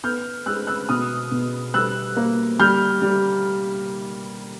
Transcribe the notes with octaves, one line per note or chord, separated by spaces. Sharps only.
B3 F6 G6
G#3 E6 F#6
E6 F#6
B2 D#6 F6
B2
G3 E6 F#6
A#3
G3 F6 G6
G3